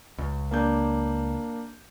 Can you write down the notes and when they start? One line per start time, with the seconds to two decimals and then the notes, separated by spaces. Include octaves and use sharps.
0.18 C#2
0.51 A#3 D4 G6